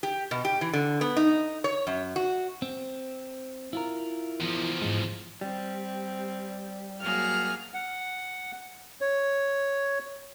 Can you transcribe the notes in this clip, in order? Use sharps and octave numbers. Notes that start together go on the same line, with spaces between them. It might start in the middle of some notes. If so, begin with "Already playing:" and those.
G4
B2
G4
E3
D3
B3
D#4
C#5
F#2
F#4
C4
E4 F4 A#4
E2 F3
G#2 G#3
G3 C4
F#3 A#3 G#4 F6
F#5
C#5